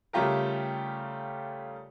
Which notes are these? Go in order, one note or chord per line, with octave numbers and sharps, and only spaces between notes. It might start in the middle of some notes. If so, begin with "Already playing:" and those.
C#3 G3 A3 F4 G4 A#4